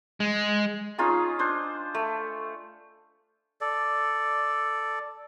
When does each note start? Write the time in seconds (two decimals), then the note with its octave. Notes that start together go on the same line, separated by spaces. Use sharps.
0.20 G#3
0.98 C#4 D#4 F4 G#4
1.39 D4 C5
1.94 A3
3.61 A4 D5